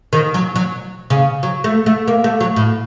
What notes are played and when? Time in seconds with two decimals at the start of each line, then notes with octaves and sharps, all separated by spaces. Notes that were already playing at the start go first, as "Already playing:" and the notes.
0.13 D#3
0.34 F#3
0.56 F#3
1.10 C#3
1.43 F#3
1.64 A3
1.86 A3
2.08 A#3
2.24 A3
2.41 F#3
2.56 A2